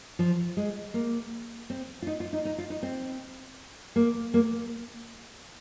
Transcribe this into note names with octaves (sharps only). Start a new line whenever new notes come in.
F3
G#3
A#3
C4
F4
D#4
F4
D#4
D#4
F4
D#4
C4
A#3
A#3